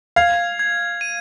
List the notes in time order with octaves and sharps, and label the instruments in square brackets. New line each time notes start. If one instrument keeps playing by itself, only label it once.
[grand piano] F5 [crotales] G#6
[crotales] G#6
D#7